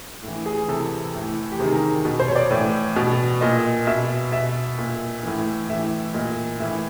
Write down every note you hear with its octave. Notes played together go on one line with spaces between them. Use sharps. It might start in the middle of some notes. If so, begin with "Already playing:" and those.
A2
E3
G#4
C3 E3 A4
A2
E3
G4
C3 D#3 G#4
A#4
B2
C5
C#5
D5
A2 E3
B2
A#2 D#5
B2 E5
B2 E5
A#2
A2 E3
A2 E3 E5
A#2 D#5
A2 E3 E5